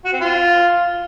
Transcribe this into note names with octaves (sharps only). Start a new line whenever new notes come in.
F#4
C4
F4